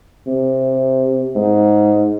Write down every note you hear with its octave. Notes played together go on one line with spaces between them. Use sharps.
C3
G#2